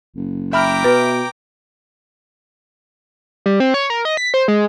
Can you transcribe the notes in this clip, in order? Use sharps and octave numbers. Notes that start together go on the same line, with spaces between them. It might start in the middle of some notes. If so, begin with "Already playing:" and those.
F#1
E5 G5 A#5 B5 D6 F6
B2 B4
G3
C4
C#5
A#4
D#5
B6
C5
G#3